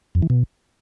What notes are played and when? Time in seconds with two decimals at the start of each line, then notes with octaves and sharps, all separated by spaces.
0.15 F2
0.22 E3
0.30 B2